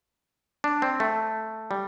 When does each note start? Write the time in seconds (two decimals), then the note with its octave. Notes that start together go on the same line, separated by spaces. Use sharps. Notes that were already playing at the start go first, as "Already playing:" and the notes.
0.64 D4
0.82 C4
1.00 A3
1.71 G3